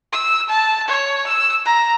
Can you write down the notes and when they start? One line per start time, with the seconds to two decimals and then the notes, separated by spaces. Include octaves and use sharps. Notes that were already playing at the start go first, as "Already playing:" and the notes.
0.12 E6
0.49 A5
0.88 C#5
1.27 E6
1.65 A#5